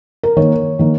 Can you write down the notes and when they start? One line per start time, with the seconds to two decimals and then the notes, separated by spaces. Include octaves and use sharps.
0.23 A#4
0.36 D#3 A#3 C#5
0.79 D#3 A#3